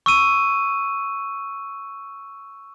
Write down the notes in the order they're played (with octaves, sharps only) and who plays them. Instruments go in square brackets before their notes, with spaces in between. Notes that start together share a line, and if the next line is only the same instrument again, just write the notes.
[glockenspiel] C#6 E6 D#7